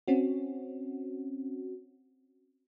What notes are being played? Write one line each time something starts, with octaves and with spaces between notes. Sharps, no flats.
C4 C#4 F#4